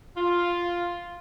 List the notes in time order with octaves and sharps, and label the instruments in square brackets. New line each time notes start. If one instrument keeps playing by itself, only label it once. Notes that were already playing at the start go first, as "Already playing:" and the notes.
[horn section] F4